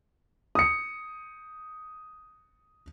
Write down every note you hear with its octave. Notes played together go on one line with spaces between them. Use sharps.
D#6 C#7